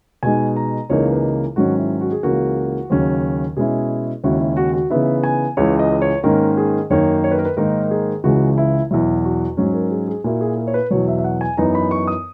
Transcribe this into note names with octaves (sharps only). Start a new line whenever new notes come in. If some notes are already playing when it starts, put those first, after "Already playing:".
B2 G#3 D#4 G#5
A#5
C#2 C#3 E3 A#3 D#4 C#5
B4
G#2 D#3 F#3 C#4 F#4
E4
F#4
G#4
C#2 C#3 E3 A#3 F#4
D#2 C#3 F#3 C#4
B2 G#3 C#4 E4 G#4
D#2 C#3 G#3 C#4 E4 F#4
E4
F#4
F#4
C#3 E3 B3 D#4 E5
G#5
C#2 C#3 E3 C#5
D#5
C#5
G#2 D#3 A#3 C#4 A#4
G#4
F#2 D#3 A#3 D#4 C#5
C#5
B4
A#4
B4
G#2 D#3 A#3 D#4 A#4
G#4
C#2 C#3 E3 G#3 F#4
E4
E2 B2 F#3 E4
F#4
G#2 F#3 C#4
A#4
G#4
G#4
A#2 A#3 E4 F#4
G#4
A#4
C#5
B4
E2 B2 F#3 C#5
E5
E5
F#5
G#5
F#2 E3 B3 D#4 A#5
B5
C#6
D#6